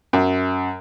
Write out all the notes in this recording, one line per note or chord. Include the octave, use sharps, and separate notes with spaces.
F#2